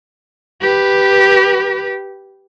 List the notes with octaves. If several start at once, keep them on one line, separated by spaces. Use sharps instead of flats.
G4 B4